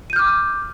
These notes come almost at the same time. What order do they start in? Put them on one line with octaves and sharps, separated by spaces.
D#7 G6 F6 D6